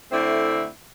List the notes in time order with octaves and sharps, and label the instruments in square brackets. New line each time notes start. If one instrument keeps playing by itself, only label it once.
[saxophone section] D3 A3 C4 E4